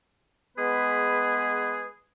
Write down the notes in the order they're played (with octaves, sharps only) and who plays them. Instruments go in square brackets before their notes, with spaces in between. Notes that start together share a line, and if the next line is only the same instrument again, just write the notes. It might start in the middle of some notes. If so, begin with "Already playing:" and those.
[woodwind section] G#3 B3 G#4 B4